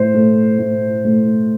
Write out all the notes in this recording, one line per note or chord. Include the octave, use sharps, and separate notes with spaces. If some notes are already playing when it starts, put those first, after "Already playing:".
Already playing: A2 C5
A3
A2
A3